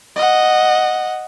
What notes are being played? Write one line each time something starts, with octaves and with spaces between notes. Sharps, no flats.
D#5 F#5